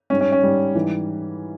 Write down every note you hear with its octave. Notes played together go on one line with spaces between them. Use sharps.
G#2 G3 C#4
C#4
C#4
G#2 G3
G#2 E3 G3